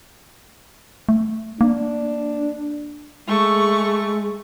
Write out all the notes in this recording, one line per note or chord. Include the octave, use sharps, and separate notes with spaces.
A3
A#3 D4
G#3 A3 C#6